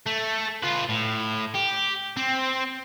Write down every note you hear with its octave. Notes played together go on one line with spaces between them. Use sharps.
A3
F4 B4
A2
G4
C4